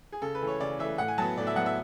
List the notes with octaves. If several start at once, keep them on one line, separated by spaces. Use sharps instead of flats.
G#4
C#3 A4
B4
E3 A3
C#5
C#3 D5
E3 A3 E5
A2 F#5
G#5
F#3 B3 A5
A2 D5
E5
F#3 B3 F#5
E5